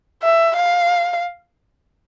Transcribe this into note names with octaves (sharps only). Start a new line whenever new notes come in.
E5
F5